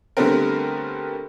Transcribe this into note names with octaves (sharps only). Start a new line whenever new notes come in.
D3 G3 A3 B3 C4 A#4